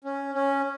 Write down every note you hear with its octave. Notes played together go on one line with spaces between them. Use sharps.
C#4
C#4